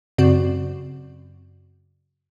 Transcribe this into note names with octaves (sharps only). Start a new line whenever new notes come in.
F#2 C#3 C4 F#4 D5